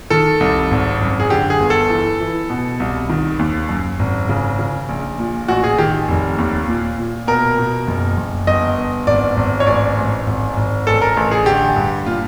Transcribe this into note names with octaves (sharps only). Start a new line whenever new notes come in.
D#3 A4
C2
G#1
F#2
G#4
D3 G4
G#4
G1
A4
E3
E3
B2
C2
D#3
D#2
F#2
G#1
C#3
C#3
A#1
A#2
A1 F#4
G#4
D#3 G4
F1
D#2
A#2
A#2
B2 A#4
B2
F#1
F#1
G1 D#5
G1
G#1 D5
G#1
C#5
A1 D5
A1
G#1
G#1
A1 A4
A#4
A1 A4
G#4
D3 G4
G2
A#2 F4